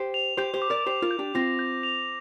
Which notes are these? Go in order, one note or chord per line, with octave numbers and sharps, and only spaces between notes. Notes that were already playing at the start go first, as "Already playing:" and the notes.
Already playing: G4 C5
F7
G4 C5 G6
G4 C5
D6
A#4 D5
G4 C5 F7
F4 A#4
G6
D4 G4
C4 F4 A#6
G6
F7